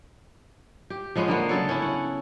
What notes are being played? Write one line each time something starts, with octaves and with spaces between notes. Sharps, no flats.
G4
F3 G#3 B3 C#4
D3 A#3 B3
C#3 F#3 A4 C#5
C#4 E4
F#5